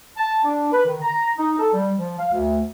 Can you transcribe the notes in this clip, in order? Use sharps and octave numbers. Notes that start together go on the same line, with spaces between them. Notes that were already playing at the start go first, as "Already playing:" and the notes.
A5
D4
B4
D#3
A#5
D#4
A4
G3
F3
F5
D2